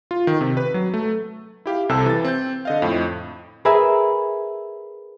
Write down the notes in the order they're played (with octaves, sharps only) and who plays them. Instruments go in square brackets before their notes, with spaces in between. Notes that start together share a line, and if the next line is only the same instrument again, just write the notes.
[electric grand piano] F4
D#3
C3
B4
F#3
A3
E4 G4 F5
C2 C3 A4 C5 A5 E6
E3 A6
C4 G6
D3 D#5 F5
F2 A2
[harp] G#4 A#4 B4 E5